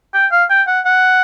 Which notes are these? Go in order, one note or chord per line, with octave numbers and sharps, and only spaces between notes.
G5
F5
G5
F#5
F#5